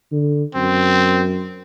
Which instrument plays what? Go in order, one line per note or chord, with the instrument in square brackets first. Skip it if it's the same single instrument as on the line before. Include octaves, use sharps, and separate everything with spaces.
[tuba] D3
[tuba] F#2 [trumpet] C4